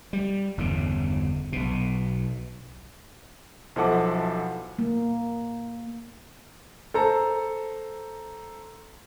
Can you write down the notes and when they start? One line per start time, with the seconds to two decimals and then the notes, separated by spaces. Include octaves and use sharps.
0.13 G3
0.58 G1 E2 C#3
1.52 B1 B2
3.76 B1 F3 E4 A4 F#5 D6
4.79 A#3
6.94 A4 C5 A5 A#5